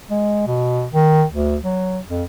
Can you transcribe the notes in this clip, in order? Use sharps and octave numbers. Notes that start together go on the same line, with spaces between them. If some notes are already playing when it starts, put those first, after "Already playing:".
G#3
B2
D#3
D2
F#3
F2